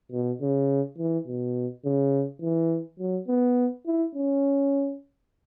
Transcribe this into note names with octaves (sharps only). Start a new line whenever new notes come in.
B2
C#3
E3
B2
C#3
E3
F#3
B3
E4
C#4